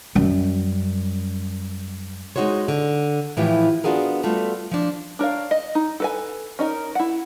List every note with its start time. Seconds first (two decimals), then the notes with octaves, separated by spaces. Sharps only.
0.15 F#2 G3
2.36 G#3 A3 D#4 F#4 C5 C#5
2.68 D3
3.37 A2 E3 F3 E4 G4
3.84 B3 D4 F4 F#4 G#4 A#4
4.23 G3 A3 B3 F4 F#4
4.71 F3 D4
5.19 D4 A#4 C#5 F5
5.51 D#5
5.75 D#4
6.00 A4 B4 G#5
6.59 C#4 D#4 E4 A#4
6.95 E4 F#5